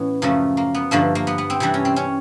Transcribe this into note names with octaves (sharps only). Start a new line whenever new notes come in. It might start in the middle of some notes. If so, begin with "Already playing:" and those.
Already playing: A2 E3 B3 C#4
F#2 C#3 F3 A3
A#3
B3
G2 D3 F3 A3 A#3
A#3
B3
B3
C4
C3 E3 G3 D4
C#4
C4
C#4